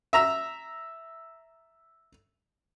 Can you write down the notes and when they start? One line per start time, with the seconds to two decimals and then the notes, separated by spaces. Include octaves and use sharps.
0.13 E5 A#5 E6